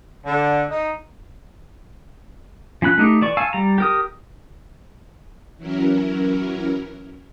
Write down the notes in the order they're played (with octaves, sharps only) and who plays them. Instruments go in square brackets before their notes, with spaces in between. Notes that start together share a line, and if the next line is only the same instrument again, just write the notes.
[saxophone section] D3
D#4
[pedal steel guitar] F3 C#4 B5 F#6
A3 D#4 G4
E3 D5 C#6
F5 G#5 A5 C#6 E6
G3 A#5
G4 A#4 D#6
[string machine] E3 F#3 C#4 E4 A#4